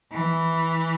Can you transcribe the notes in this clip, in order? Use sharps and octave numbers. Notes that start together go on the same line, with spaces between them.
E3